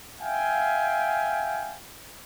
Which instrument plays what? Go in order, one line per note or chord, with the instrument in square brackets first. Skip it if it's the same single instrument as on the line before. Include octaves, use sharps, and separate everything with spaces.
[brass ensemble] E5 F5 G5 G#5